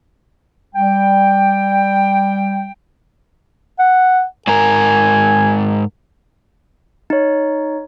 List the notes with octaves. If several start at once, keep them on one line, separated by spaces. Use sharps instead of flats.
G3 G5
F#5
G#2 A#4 G#5
D#4 C#5